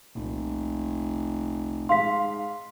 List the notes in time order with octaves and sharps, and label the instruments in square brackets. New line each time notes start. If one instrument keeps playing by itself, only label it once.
[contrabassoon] F1 [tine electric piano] C2 A#2
[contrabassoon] G#2 [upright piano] F5 [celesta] C6 B6